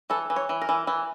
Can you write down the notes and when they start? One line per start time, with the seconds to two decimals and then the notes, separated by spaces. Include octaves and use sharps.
0.10 E3 A4
0.30 E3
0.36 C#5
0.49 E3
0.62 A#4
0.69 E3
0.87 E3